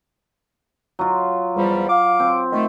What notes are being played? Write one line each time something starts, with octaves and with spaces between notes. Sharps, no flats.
F#3 F4
E2 F3 G3
F5 D6
C4
D#3 A3